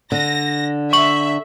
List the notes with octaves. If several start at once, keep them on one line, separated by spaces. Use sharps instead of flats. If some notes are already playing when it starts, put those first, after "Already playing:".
D3 A#6
E5 C#6 F#7